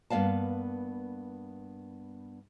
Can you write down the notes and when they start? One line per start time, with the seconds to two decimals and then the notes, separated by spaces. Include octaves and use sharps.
0.10 G2 A#3 B3 D5 F5 A5